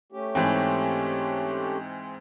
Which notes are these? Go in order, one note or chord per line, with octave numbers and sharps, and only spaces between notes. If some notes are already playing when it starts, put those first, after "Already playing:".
A3 C#4 G4
G#2 E3 C4